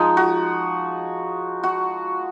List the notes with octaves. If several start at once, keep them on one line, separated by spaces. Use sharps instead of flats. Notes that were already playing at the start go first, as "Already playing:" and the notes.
Already playing: F3 G#3 D#4
F#4
F#4